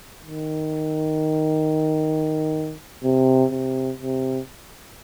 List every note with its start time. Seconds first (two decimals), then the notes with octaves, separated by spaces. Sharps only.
0.23 D#3
3.04 C3
3.51 C3
3.98 C3